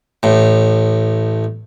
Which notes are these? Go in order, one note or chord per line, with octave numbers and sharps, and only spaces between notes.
A1 A2